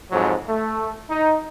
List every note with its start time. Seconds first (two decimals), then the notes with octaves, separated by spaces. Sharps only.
0.11 F2 G#2 F#3
0.48 A3
1.10 D#4